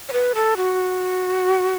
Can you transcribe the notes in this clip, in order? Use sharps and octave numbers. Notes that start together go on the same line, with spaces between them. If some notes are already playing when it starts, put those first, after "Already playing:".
C#5
B4
A4
F#4